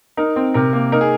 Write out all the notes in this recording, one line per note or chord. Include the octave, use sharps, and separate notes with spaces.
D#4 A#4
C4
C3 A#4
A#3
D#4 A#4
G#4